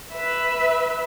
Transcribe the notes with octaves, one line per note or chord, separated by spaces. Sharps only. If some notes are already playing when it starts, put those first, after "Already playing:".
B4 E5